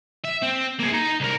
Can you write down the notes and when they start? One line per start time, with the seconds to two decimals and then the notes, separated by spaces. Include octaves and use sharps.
0.24 E5
0.42 C4
0.79 A#3 G#4
0.93 D#4 A#5
1.20 C2 A#4